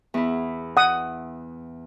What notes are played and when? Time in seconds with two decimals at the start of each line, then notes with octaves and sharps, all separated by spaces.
0.14 E2 E4
0.77 F#5 D#6